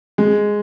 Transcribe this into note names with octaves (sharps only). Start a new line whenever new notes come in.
G#3